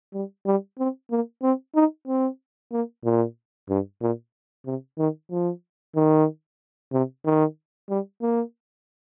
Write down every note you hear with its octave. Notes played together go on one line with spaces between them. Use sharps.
G3
G3
C4
A#3
C4
D#4
C4
A#3
A#2
G2
A#2
C3
D#3
F3
D#3
C3
D#3
G3
A#3